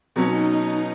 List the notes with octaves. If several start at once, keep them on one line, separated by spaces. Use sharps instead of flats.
B2 F#3 C#4 D#4